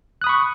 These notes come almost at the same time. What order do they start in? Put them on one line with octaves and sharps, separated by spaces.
F#6 D#6 B5 C#6